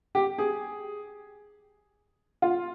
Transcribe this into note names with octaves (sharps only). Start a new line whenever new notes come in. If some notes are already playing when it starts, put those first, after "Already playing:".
G4
G#4
F4